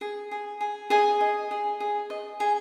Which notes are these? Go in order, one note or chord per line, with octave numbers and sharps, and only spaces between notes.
G#4
G#4
G#4
G#4 D#5 G#5
D#5
G#4
G#4
D#5
G#4